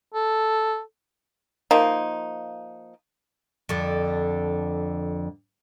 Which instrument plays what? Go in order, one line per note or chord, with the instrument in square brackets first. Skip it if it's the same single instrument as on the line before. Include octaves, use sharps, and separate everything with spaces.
[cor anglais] A4
[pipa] F3 A#3 D#4
[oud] F2 D3